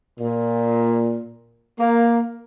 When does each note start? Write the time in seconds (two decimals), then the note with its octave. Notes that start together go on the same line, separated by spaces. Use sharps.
0.20 A#2
1.80 A#3